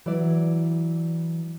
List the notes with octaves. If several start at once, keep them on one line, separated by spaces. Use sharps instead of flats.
E3 F#3 E4 D5